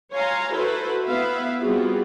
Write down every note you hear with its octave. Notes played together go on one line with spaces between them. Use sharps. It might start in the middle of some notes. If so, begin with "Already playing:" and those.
C#5 F5 G#5 A#5 C6
E4 F#4 A4 B4 C5
B3 E4 B4 E5 F5
G3 B3 C4 F4 F#4 G#4